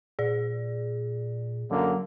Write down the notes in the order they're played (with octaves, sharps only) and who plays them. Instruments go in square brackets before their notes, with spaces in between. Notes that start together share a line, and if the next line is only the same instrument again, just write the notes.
[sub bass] A#2 [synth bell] G#4 D5
[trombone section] F#2 D3 A#3 [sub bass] F#3